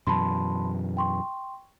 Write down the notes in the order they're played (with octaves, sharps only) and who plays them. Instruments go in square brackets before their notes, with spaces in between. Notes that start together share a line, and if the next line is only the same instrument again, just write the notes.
[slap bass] F#2 B2 E3 [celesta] A5 B5 C6
[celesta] G5 C6 C#6